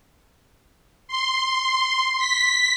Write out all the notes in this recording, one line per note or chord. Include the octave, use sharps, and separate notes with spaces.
C6
B6